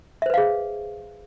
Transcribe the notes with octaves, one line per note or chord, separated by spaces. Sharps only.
G#4 B4 C5 E5 F5